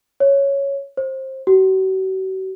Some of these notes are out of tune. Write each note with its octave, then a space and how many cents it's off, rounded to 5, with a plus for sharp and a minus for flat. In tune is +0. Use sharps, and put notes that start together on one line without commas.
C#5 +0
C5 +20
F#4 +45